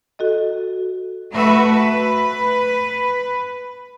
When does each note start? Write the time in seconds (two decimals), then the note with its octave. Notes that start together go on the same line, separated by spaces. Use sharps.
0.19 F#4 A4 D#5
1.32 A3 F#4 B4 E5
1.71 B4